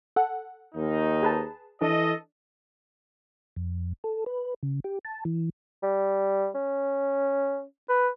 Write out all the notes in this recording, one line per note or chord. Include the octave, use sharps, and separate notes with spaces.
A4 F#5
D#2 D#3 D#4
G#4 B4 A5
E3 D4 A4 D#5
F2
A4
B4
C#3
G4
A5
E3
G3
C#4
B4